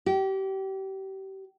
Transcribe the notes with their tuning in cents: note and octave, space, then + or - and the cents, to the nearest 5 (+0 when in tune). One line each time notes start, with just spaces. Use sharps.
G4 -30